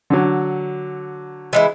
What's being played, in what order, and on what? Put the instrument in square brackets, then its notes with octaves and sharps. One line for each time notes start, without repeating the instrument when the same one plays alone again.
[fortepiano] D3 F#3
[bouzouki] E3 G#3 E4